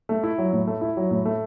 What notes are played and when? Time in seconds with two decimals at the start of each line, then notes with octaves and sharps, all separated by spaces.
0.09 A3
0.23 E4
0.38 F#3
0.53 A2
0.68 A3
0.81 E4
0.97 F#3
1.11 A2
1.26 A3